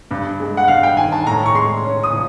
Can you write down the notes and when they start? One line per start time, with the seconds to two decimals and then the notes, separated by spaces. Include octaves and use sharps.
0.11 G2
0.40 G#3
0.57 F#5
0.68 G2 F5
0.83 G5
0.97 D#3 G#5
1.12 A5
1.26 A2 A#5
1.46 C#6
1.54 G#3 C6
1.84 C#4
2.03 D#6
2.13 F3